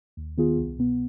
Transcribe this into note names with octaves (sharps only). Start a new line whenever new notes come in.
D#2
D#3 B3 F4 G#4
C2
B2 B3